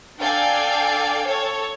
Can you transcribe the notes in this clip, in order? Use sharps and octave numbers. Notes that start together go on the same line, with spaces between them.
D4 A4 D5 F5 G5 G#5
A4 C#5